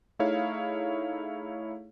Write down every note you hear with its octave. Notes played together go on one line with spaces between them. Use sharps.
A3 D#4 E4 G#4 C#5 F5